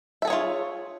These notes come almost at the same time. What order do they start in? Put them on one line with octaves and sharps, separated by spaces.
E5 A4 G#4 C#5 F4